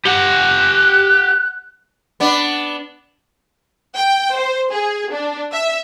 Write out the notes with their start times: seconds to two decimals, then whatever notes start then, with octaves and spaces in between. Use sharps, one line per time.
0.06 G4 F#5 F#6
2.20 B3 D4
3.94 G5
4.35 C5
4.71 G#4
5.12 D4
5.52 E5